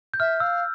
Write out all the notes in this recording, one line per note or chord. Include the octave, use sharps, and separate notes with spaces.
G6
E5 F6
F5 E6